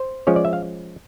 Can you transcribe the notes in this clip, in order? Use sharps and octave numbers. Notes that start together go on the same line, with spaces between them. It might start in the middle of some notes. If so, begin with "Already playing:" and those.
Already playing: C5
F3 G#3 C#4 C#5
D5
E5
F5